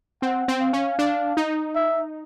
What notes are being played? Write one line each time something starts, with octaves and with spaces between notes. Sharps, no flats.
C4 F#5
C4
F5
C#4
D4
D#4
E5